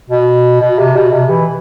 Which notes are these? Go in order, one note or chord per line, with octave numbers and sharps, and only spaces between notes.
B2
B2
C3
B2
C3
E3